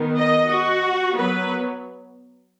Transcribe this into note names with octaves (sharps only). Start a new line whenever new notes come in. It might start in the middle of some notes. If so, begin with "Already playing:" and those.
Already playing: D#3 B3
D#5
F#4
F#3 B3 B4